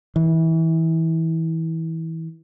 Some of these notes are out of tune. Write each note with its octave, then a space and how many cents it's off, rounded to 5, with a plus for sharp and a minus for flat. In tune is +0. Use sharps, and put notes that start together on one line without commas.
E3 -25